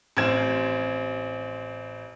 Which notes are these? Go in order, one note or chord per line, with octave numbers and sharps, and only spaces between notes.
A1 C4 G#6 E7